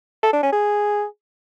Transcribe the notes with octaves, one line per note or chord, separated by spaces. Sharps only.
A4
D4
C#4
G#4